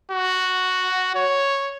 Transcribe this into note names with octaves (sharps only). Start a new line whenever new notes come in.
F#4
C#5